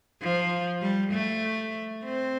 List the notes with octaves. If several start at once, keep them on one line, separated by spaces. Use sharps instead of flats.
F3
G3
A3
C4